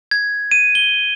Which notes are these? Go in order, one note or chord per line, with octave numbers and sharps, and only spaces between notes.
G#6
D#7
G7